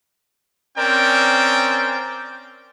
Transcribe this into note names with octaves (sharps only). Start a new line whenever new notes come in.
C4 C#4 A#4 D5 G5